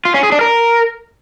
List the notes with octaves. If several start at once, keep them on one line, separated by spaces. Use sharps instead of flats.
F4
C#4
G#4
D4
A#4